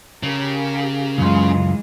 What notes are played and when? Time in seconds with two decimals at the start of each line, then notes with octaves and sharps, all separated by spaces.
0.23 C#3 G4 A#4
1.18 C#2 F#2 E3 G#3 F4